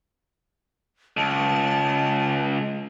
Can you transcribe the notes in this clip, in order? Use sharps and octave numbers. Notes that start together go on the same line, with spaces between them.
C#2 A5